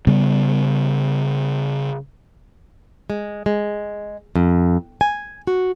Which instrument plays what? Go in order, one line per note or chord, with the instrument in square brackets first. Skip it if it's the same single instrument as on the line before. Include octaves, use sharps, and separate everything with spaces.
[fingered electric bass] C#3 G3 B3
[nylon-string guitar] G#3
G#3
F2
G#5
F#4